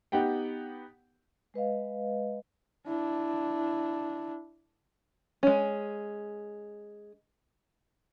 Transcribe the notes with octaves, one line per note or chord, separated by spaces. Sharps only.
B3 D#4 G4 F#5 G5
G#3 B4 D#5 F5
D4 E4
G#3 C#4